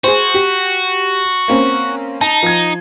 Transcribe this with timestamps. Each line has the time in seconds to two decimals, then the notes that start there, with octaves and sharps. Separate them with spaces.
0.04 F#4 G#4 C5
0.34 G4
1.48 A#3 C4 C#4
2.21 D#4 A5
2.43 F3 G#6